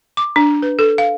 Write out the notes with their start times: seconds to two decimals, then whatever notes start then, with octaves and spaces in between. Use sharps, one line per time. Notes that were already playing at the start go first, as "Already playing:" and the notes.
0.17 D6
0.36 D4
0.62 B4
0.79 A4
0.98 F5